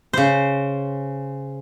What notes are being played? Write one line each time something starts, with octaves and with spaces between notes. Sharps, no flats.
C#3 C5